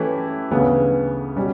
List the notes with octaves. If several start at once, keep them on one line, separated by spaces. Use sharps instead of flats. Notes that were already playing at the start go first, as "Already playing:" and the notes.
Already playing: E3 A3 C#4 E4 G4
D2 C#3 E3 B3
B2 G3 C#4